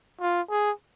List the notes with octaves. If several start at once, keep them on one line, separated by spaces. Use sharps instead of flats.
F4
G#4